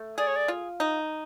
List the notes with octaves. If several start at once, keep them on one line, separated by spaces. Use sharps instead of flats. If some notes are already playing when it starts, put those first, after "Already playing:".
Already playing: A3
G#4 D5
C#5
D5
F4
D#4